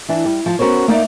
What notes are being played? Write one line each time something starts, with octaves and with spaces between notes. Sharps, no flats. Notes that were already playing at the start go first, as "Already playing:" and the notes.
E3 D4
G3
F3 A5
B3 C#4 F#4 A#4 C5 C#5
A#3 D#4 D5 E5